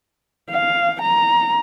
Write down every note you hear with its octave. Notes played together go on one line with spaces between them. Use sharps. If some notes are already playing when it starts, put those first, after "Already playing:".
F5
A#5